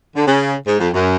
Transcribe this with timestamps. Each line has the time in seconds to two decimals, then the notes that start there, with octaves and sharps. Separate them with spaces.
0.16 D3
0.27 C#3
0.66 G#2
0.79 F2
0.93 F#2